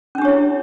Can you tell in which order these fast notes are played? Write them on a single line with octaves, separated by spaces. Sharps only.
C#4 D4 G4 C#5 E4